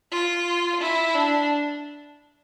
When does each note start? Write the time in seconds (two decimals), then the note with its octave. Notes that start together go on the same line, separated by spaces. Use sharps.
0.12 F4
0.81 E4
1.15 D4